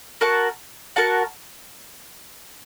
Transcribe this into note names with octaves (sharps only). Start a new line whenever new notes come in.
F#4 A#4 F#5 A5
F#4 A#4 F#5 A5